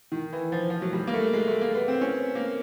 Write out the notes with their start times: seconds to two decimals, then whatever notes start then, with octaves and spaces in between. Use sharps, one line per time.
0.12 D#3
0.33 E3
0.52 F3
0.70 F3
0.82 F#3
0.93 G3
1.07 A#3
1.14 A3
1.33 G#3
1.47 A3
1.62 A#3
1.75 B3
1.88 C4
2.01 C#4
2.35 A#3